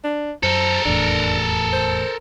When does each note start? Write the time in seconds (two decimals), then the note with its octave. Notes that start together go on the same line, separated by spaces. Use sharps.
0.04 D4
0.43 F#2 A4 A#4 C5
0.85 F1 E2 A2 D4
1.73 C5